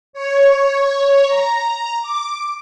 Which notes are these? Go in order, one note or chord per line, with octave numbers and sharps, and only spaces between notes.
C#5
A#5
D6